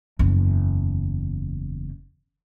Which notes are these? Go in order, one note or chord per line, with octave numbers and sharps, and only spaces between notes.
F#1 E2